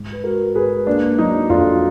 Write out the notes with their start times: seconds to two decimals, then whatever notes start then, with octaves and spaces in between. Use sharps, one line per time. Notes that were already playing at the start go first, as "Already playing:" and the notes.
Already playing: G#2
0.12 B4
0.24 G#3 F#4 A#4
0.55 G#2 G#4 B4
0.87 A#3 D4
1.18 F#3 D#4
1.50 F2 D4 F4